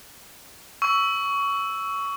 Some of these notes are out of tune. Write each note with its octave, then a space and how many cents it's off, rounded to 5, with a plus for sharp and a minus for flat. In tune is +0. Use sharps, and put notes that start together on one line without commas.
C#6 +20 E6 +0